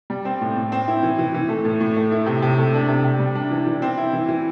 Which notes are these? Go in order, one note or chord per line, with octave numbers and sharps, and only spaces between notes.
G3
C4
A2
A2
C4
E4
E3
E3
E3
A3
A2
A2
A3
E4
C3
C3
A3
D4
C3
C3
G3
D4
E3
E3
C4
E4
E3
E3